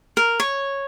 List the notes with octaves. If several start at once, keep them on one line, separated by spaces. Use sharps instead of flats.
A#4
C#5